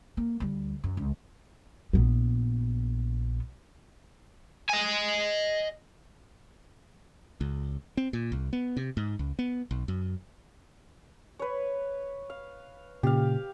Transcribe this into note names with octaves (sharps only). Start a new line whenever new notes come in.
A#3
D2 G3
F#2
C#2
A#1 B3
D#5 G#5
C#2
C4
A#2
C2
B3
C3
G#2
C#2
B3
B1
F#2
B4 C#5
F5
A#2 C#3 G4 F5